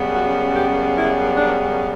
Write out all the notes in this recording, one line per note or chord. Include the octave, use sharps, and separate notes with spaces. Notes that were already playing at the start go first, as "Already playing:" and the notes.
Already playing: F#2 C#3 G3 B3
F#4
G4
E4
D4